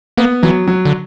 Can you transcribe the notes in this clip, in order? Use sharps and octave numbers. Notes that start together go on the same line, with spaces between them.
A#3 B3
E3 F#3
F#3
D3